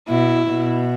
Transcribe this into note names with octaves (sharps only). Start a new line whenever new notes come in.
B2 E4
B2